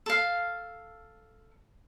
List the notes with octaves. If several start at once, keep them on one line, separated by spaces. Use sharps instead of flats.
A4 F5